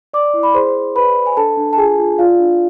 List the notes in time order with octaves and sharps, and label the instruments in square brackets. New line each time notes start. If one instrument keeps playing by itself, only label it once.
[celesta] D5 D6
E4
B5
G#4 C5 C6
C5
B4 D5 B5
G#4
G#5
D4 A4 A5
D4
A5
F4 G#4 G#5
F4
F4 D5 F5
D4